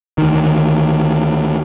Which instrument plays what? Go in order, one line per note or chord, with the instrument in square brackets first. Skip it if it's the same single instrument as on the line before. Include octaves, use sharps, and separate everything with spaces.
[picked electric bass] D2 D#3